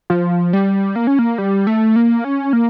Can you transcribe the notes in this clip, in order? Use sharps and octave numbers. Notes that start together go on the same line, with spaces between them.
F3
G3
A#3
C#4
A#3
G3
A3
A#3
C#4
A#3